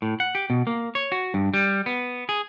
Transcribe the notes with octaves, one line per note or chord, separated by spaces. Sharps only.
A2
F#5
G4
B2
A#3
C#5
F#4
G2
G3
B3
G#4